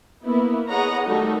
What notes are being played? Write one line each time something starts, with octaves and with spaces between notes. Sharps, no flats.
A#3 B3 E4
G#4 B4 C#5 D#5 F#5 A#5
D#3 G3 A3 D#4 F#4 A4